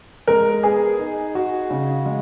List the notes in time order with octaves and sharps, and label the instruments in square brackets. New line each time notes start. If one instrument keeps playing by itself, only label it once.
[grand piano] G#3 [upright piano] A#4
[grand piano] B3 [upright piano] G#4
[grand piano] D#4
F#4
C#3
G#3